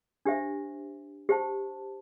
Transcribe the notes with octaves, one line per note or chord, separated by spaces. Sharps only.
D4 G4 C5 E5
G4 C5 A5